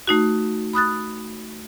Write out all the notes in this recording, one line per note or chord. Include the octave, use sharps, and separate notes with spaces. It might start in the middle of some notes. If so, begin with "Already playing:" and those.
A3 D#4 F#4
B5 D#6 F#6 A6